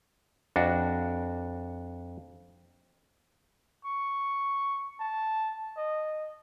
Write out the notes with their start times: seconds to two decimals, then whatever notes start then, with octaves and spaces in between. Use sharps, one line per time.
0.56 F2 D4 F#4
3.85 C#6
5.00 A5
5.77 D#5